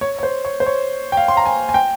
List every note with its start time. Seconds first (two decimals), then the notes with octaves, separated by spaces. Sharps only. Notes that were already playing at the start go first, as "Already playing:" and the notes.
0.01 C#5
0.19 C#5
0.23 C5
0.45 C#5
0.60 C5
0.66 C#5
1.12 G5
1.17 F5
1.28 C6
1.37 A#5
1.46 G#5
1.69 G#5
1.74 G5